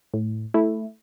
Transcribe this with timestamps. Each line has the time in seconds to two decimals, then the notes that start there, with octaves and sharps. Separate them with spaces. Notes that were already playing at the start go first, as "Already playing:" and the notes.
0.14 A2
0.54 A3 E4